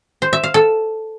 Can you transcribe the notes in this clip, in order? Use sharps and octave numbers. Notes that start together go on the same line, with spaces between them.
C5
E5
F5
A4